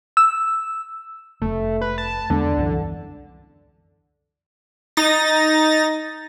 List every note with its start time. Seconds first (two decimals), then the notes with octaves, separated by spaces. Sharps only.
0.17 E6
1.42 F1 A3
1.81 B4
1.98 A5
2.30 E2 D3 G#3 B3
2.57 C2 F#2 E3
4.97 D#4 A6 A#6